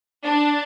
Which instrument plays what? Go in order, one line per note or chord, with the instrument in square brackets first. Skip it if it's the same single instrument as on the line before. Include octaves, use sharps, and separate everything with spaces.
[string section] D4